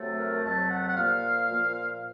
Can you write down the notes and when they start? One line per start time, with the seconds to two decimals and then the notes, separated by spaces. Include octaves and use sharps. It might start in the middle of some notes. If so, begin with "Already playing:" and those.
Already playing: C3 F#3 A3
0.16 A#4
0.43 F2 C3 F#3 A3 A5
0.70 F#5
0.87 F#5
0.95 A#2 F3 A#3 F5
1.50 A#2 F3 A#3